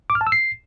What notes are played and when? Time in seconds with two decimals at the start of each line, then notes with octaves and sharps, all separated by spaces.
0.10 D6
0.15 F6
0.21 A5
0.27 E6
0.32 C7